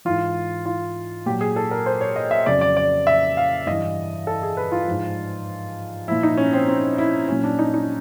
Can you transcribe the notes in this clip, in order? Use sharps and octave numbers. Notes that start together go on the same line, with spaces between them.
G#2 E3 F4
F4
A#2 F#3 G4
G#4
A4
A#4
C5
C#5
D#5
E5
F2 C#3 F#3 D5
D5
D5
E5
F5
G2 E3 D#5
A4
G#4
B4
F4
G#2 F3
A#2 F3 E4
D#4
C#4
C4
C4
E4
A#2 F#3 C#4
D4
D#4
D#4